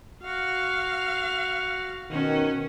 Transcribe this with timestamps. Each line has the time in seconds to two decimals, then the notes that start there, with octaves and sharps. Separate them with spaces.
0.23 F#4 F5
2.11 B2 D#3 C#4 F#4